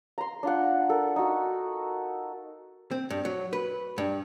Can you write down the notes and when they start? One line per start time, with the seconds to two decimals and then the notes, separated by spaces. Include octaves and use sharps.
0.18 A#5 C6
0.43 D4 F4 F#5
0.89 A4 A#4
1.16 D#4 F#4
2.91 C4
3.10 G2
3.25 F#3
3.53 B4
3.98 G2